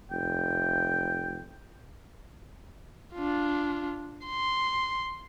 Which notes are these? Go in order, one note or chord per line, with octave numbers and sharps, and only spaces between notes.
F1 G5
D4 F4
C6